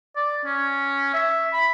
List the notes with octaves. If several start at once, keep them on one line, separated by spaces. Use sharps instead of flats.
D5
C#4
E5
B5